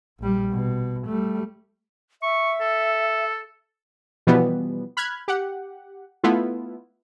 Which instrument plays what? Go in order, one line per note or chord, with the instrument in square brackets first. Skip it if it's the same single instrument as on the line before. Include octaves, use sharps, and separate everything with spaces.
[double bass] A#1 G3
B2
G3 A3
[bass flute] E5 [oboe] C#6
[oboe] A4
[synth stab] B2 E3 F3 G3 B3
B5 F6 F#6 G#6
G4 F#5
A3 B3 E4 F4